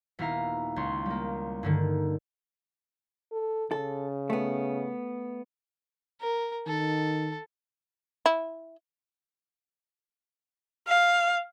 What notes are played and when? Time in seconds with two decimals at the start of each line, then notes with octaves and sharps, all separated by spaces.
0.19 D#1 B3 E4 F5 A#5
0.76 C#2 C#5 C6
1.06 G3 A#3
1.63 G2 D3 D#3
3.32 A4
3.71 C#3 A4
4.30 A3 B3
6.20 A#4
6.67 D#3 A4
8.26 E4
10.88 F5